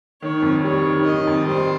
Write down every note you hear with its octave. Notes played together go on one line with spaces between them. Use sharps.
D#3 C#5
F2
G3 C#5
D#3
D#3 D#5
F2
G3 C5